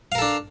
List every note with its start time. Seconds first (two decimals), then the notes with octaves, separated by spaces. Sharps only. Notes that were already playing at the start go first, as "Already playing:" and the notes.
0.12 F5
0.15 A#4
0.18 A4
0.22 D4